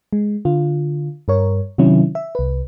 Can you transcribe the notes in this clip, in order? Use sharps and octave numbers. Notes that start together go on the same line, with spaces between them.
G#3
D3 F4
G2 A#4 C#5
C3 D#3 F#3 C#4 E4
E5
C2 B4